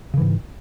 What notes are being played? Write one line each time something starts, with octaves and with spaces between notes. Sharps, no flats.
G#2 C#3 E3